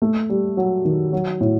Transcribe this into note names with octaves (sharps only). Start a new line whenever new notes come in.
A3
G3
F#3
D#3
F#3
A2